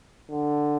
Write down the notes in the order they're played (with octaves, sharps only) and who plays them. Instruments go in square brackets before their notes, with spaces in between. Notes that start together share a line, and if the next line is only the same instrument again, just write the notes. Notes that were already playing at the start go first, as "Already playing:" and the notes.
[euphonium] D3